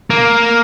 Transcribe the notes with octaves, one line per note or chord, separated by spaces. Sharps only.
A#3